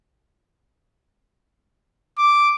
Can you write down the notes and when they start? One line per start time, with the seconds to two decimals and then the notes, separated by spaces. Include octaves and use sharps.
2.18 D6